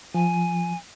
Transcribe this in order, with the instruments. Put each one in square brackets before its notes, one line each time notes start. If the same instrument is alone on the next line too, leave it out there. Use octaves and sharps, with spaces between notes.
[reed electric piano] F3 [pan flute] G#5